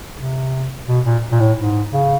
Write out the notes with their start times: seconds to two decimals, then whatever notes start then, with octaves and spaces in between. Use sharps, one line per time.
0.18 C3
0.88 B2
1.05 A#2
1.32 A#2
1.40 A2
1.58 G#2
1.93 C#3